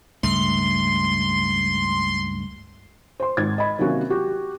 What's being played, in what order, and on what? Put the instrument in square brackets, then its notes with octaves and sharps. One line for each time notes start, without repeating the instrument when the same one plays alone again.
[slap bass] C#2 G2 A3 [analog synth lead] C6
[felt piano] C5 C6
G#1 D#4 G#6 A6
D#5 B5
C3 D#3 F#3 A#3 C#4 F#4
F#4 G4